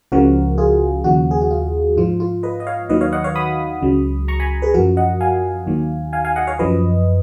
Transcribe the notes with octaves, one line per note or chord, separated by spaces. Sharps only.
C#2 C#3 F3 F#4 A#4
F4 G#4
D#2 C#3 F3 F#4
G#4
F#4
F4
G#2 F3 F4
F4
B4 D#5
D#5
C#5 F5
D#2 D#3 F#3 B4 D#5
C#5 F5
D#5 F#5
C#5 F5
B5 D#6
C#2 C#3 F#3
A#5 C#6
G#5 B5
G#4 B4
F#2 F3 F#4 A#4
D#5 F#5
F5 G#5
D#2 D#3 F#3
F5 G#5
F5 G#5
D#5 F#5
C#5 F5
F#2 F3 B4 D#5